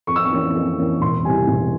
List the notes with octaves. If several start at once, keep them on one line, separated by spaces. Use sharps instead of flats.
F2 C#6
E6
C#6
E3 A#3 C#4
F2
E3 A#3 C#4
E1 C6
E2 C3 G3 G#5
E1